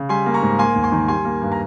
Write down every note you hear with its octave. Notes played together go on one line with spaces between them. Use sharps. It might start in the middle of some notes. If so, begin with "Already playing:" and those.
Already playing: C#3
G3 G#5 C6
A#3
A#5 C#6
G#2
A#3 G#5 C6
D#2
G#5 C6
D#3
G3 G#5 C6
A#3
G2
A#5